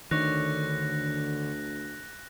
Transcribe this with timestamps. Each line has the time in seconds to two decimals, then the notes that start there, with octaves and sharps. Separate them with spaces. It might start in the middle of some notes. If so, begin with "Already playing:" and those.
0.11 D2 D3 D#3 C#5 F#6 A#6